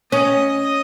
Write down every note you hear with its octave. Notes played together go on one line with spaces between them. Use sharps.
C#4 D#5